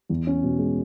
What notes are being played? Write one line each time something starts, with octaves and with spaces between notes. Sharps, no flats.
E2
C#4
B2
G#3